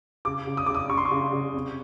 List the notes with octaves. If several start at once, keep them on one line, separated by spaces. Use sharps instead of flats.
C#3 D6
C#3
D#6
C#3 D6
D#6
C#3 C#6
C6
C#6
C#3
C#3
C3